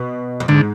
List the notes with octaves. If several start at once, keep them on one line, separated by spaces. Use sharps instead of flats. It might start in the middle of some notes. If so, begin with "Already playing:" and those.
Already playing: B2
F2
G#2 D3